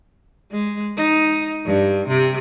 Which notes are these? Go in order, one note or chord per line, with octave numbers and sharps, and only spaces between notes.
G#3
D#4
G2
C3